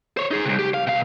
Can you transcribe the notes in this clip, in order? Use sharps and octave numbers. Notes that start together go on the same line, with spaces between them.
C5 C#5
D#4 G#4
C2 C3
G4
F5
B2 F5